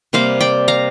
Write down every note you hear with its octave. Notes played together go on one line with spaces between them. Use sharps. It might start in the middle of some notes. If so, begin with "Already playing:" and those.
C3 G3 A#3 C5 F5
D5 G5
F5 A#5